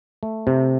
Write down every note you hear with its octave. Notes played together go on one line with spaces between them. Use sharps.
A3
C3